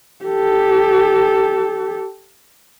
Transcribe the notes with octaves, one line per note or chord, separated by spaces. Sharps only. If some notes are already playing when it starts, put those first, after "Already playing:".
G4 A4